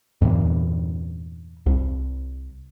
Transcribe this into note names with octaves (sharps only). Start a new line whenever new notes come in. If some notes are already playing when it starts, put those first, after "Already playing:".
E2 G2 A#2 E3
C2